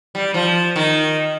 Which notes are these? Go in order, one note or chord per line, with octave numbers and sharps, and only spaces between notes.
G3
F3
D#3